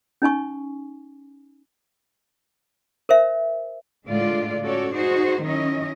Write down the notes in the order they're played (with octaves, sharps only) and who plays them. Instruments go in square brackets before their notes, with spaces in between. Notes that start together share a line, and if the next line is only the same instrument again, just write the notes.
[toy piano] C#4 D#4 G#5 C#6
A#4 C5 E5
[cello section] A2 D3 G#3 F4 D5
C#4 F#4 A4 C#5 D5
D#4 F#4 G#4 C5
D#3 F#3 C#4 E4 D#5